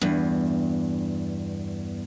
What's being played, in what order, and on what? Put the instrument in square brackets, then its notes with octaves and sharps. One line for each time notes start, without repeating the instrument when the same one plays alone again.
[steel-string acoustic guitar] E2 G2